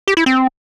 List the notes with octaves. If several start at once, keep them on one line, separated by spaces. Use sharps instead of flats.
G4
E4
C4